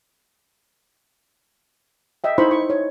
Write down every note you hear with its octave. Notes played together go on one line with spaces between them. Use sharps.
D#5 E5 G5
D#4 E4 C5 B5 C#6
C#6
C#5